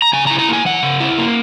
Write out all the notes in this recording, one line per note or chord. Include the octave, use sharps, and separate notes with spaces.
A#5
C#3 G#5
A#5
E4
A#5
A#3 G#5
E3 F#5
C#3
E4
A#3